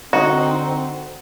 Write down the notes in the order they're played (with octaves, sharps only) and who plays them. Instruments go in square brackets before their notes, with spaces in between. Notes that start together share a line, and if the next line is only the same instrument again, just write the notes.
[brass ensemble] D3 C4 [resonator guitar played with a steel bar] D#4 [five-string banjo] F#4